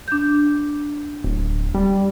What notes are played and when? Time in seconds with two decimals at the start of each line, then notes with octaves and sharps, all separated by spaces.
0.08 D4 G6
1.24 D1
1.74 G3